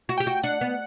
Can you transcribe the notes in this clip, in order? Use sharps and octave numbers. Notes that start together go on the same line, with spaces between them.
F#4
G4 G5
F#4
D4 F#5
B3